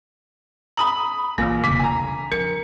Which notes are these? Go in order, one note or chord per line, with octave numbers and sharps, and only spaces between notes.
A#5 B5 D#6 F#7
A#1 A#2 E3 A#3
E1 C#3 A3 B6
D4 G#5 A#5
F3 A#4 C#7